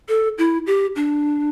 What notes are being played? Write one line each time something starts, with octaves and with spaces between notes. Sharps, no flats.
A4
E4
G4
D4